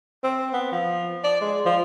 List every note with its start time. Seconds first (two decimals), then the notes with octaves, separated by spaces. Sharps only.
0.24 C4
0.53 B3
0.72 F3
1.24 D5
1.41 G#3
1.66 F3